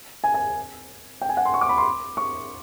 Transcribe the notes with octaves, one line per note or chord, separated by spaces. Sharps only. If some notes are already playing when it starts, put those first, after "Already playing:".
G#5
G#5
G5
G#5
F#5
C6
C#6
D6
B5
C6
C#6